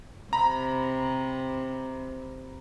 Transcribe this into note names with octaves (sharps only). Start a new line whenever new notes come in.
C3 A#5 B5